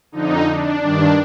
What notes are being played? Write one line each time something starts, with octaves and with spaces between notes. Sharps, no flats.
F2 D3 D#4
D4
G2 D#3 D4